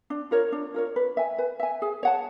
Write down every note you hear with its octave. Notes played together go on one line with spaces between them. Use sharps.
D4
F4 A#4 C#5
D4
F4 A#4 C#5
B4
E5 G#5
B4
E5 G#5
G#4
C#5 F#5 A5